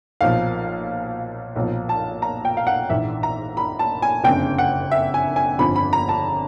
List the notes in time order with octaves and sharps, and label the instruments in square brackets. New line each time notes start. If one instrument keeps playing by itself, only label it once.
[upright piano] B1 A#2 F3 F5
B1 A#2 F3
A5
A#5
G5
F5
F#5
A#1 G#2 E3 E5
A#5
B5
A5
G#5
F#1 F2 D3 G5
F#5
E5
G#5
G#5
G1 F2 D3 F3 B5
B5
A#5
A5